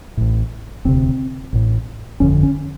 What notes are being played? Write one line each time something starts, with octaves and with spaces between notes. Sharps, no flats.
A1 A2
E1 D2 C3 C4
A1 A2
G1 F2 D3 C#4
C#4